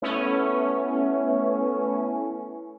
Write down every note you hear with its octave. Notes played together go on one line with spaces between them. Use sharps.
A3 B3 C#4 E4